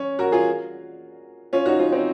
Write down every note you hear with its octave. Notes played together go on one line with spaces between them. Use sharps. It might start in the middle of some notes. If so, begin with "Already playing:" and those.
Already playing: C#4
F#4 A#4
F4 G#4
C#4 F4
D#4 F#4
C#4 F4
C4 D#4